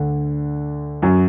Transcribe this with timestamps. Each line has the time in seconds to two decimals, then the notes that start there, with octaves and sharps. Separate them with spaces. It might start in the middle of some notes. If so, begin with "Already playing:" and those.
Already playing: D2 D3
1.02 F#2 F#3